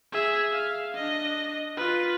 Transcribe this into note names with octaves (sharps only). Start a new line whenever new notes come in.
G#4 E5
F5
D4 D#5
F4 B4